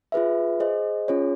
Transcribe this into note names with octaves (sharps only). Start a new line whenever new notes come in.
F4 G#4 B4 E5
G#4 C5 D#5
C#4 F4 G#4 C#5